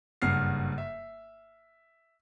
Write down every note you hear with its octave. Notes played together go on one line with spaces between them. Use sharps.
F#1 G2 F#5 F6 C7
E5